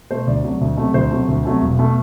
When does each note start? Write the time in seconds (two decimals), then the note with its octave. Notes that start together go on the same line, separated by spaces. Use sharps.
0.11 B2 A3 C5
0.27 D2 D5
0.44 C3 F#3 A3
0.61 D2
0.77 C3 F#3 A3
0.94 D2 C5
1.11 C3 F#3 A3
1.28 D2
1.45 C3 F#3 A3
1.62 E1
1.79 B2 A3